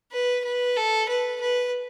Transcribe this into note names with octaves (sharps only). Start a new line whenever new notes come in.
B4
B4
A4
B4
B4